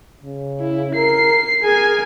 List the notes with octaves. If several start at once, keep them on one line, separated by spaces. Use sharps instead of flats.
C#3
E4
A#4 C7
G#4 A#4 G#5